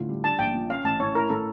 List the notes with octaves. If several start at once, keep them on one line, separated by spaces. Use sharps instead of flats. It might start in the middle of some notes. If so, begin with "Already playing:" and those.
Already playing: A2 D3 F4
G3
D4 A5
A#1 G5
A#2
C#4 F5
A1 A5
A2 C#5
E4 A#4
A2 A4